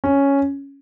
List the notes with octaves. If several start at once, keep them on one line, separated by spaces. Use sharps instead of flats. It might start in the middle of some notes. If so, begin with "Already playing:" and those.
C#4